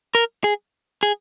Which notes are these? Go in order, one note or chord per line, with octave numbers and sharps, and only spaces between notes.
A#4
G#4
G#4